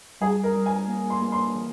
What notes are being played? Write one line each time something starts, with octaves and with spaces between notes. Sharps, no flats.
G3 G#4
A#4
G3
G#5
A#3
C6
A#3
C6
E3